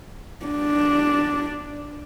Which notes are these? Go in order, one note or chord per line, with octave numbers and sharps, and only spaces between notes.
D4